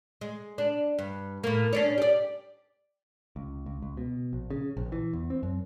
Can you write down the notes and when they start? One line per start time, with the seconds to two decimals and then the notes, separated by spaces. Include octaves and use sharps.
0.21 G#3
0.58 D4
0.99 G2
1.44 A2 A#3
1.73 C#4 D4 C#5
1.98 G4 D5
3.36 C#2
3.66 C#2
3.82 C#2
3.97 B2
4.33 A#1
4.50 C#3
4.77 A#1
4.92 E3
5.13 E2
5.30 C4
5.43 F#2